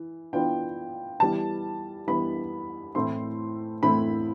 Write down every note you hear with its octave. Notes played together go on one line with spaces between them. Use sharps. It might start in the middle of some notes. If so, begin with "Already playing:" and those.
Already playing: E3
E3 B3 D4 F4 G5
E3 G3 B3 A5
E3 G3 B3 B5
A2 E3 A3 C4 E4 C6
A2 E3 A3 C4 E4 B5